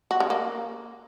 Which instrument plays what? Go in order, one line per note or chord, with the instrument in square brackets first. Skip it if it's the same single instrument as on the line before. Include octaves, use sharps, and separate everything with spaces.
[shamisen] F#4
C#3
A#3